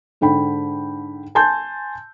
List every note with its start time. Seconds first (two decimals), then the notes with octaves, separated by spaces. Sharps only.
0.21 G#2 D3 G5 B5
1.35 G#5 A5 C6 G6